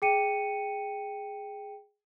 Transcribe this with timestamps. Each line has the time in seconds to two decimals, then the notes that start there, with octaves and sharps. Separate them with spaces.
0.02 G#4 G5 C#7 D#7